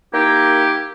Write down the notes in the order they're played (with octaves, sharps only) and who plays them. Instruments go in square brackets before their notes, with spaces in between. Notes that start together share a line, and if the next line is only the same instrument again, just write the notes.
[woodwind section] A#3 D#4 E4 G4